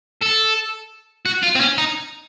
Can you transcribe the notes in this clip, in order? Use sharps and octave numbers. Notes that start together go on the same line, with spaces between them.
A4
F#4
F4
C4
C#4
D#4